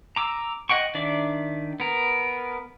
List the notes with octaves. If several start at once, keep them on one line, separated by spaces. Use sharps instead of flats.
A#5 D6 E6
D#5 F#5 G5 C#6
D#3 D4 D5 E5 D6
B3 A#4